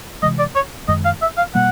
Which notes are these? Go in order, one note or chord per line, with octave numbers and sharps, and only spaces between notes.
C3 E3 G#3 D#5
D5
C#5
F#2 D#3 G#3 D#5
F5
E5
F5
B2 G3 A#3 F#5